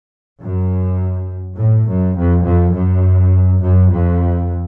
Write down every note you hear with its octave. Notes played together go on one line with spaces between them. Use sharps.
F#2
A2
F#2
F2
F2
F#2
F#2
F2